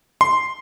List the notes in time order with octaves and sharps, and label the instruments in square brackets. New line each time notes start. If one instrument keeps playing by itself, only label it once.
[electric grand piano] C6